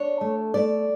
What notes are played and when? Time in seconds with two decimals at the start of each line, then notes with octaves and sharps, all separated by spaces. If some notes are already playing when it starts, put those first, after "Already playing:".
Already playing: D4 C#5
0.21 A3
0.54 A3 D5